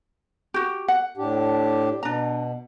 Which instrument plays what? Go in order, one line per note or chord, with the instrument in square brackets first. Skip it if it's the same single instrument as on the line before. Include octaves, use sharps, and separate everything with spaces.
[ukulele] F#4 G4
F#5
[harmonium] A2 D4 G4
[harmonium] B2 [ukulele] D4 A#5